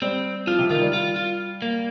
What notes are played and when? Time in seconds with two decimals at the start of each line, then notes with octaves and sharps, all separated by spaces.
0.02 G3 C4
0.47 F3 F4
0.59 C3
0.70 D#3 F4
0.81 G3
0.93 F4
1.16 F4
1.62 A#3